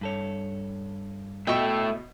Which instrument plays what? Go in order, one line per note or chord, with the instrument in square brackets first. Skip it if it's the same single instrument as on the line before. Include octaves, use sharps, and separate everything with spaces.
[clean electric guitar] G2 A4 C#5
[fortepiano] B2 D#5 [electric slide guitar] A3 E4 [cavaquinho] G5 C#6